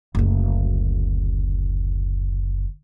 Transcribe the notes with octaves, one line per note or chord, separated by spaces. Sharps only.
F#1 D2